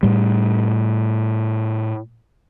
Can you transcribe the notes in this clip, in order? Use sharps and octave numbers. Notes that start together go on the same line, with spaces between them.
A2 G3